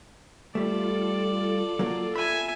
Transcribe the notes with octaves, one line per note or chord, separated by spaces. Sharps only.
G3 A3 F4 A4 D5
F#3 A#3 A#4
E5 G#5 B5